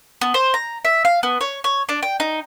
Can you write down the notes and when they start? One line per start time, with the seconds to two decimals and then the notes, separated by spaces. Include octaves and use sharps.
0.21 B3
0.34 C5
0.54 A#5
0.85 E5
1.05 F5
1.23 B3
1.41 C#5
1.64 C#5
1.89 D4
2.03 G5
2.20 D#4